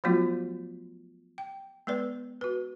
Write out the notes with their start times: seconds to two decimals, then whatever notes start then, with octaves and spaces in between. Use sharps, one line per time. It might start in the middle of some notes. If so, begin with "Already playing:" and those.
0.04 F3 F#3 A3 B3 F4 F#4
1.38 G5
1.87 G#3 B3 B4 D5
2.41 F#4 B4